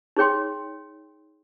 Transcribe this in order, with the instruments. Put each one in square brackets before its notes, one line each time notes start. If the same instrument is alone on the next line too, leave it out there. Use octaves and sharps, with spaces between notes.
[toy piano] D#4 G#4 C#5 G5 C6